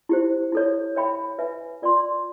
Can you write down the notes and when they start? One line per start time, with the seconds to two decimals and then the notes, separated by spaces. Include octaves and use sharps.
0.09 E4 G4 C5
0.52 E4 A4 C#5
0.95 A#4 C#5 E5 G5 B5
1.39 B4 E5 G#5
1.82 F4 A#4 D5 G5 C6